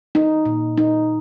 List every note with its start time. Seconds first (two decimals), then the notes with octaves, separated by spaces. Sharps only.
0.15 D#4
0.46 A#2
0.77 D#4